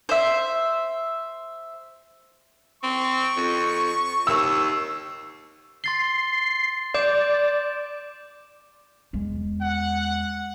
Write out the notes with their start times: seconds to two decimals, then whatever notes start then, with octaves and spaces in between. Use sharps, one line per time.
0.09 C5 E5
2.83 C4 C#6
3.37 F2
4.27 D#2 E6
5.84 C6 A6 C7 G7
6.94 D5 D6 G6 E7
9.13 E2 G#3
9.61 F#5